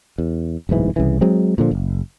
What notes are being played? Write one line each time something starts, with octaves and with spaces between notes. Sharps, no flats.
E2
D1 B1 G#2 E3
C2 C#3 E3
F#3 G#3 C4
A#2 D3 F3
F#1